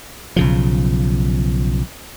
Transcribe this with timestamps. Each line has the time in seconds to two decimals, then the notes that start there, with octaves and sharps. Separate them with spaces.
0.36 B1 C#3 F3